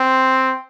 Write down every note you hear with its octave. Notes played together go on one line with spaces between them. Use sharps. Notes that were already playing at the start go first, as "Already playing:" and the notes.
Already playing: C4